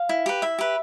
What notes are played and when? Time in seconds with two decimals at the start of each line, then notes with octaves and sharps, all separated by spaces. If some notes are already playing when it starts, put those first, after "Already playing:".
Already playing: F5
0.09 E4
0.26 G4 B4
0.42 E4 E5
0.59 G4 B4